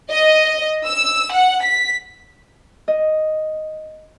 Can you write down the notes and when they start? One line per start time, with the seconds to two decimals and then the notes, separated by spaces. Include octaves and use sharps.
0.11 D#5
0.87 E6
1.33 F#5
1.64 B6
2.88 D#5